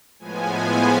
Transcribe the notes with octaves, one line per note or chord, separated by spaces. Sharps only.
A2 F3 G#3 B3 G#5